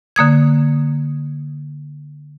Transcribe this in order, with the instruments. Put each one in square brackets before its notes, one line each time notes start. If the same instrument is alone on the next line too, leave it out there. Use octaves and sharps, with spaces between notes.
[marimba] D3 A#3 D#6 G#6